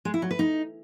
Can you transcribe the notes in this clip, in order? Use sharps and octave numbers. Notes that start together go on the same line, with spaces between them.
G#3
E4
F#3
B4
D#4